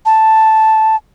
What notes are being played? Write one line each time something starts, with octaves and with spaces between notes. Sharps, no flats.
A5